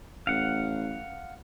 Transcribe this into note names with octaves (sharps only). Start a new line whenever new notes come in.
A1 F5 F#5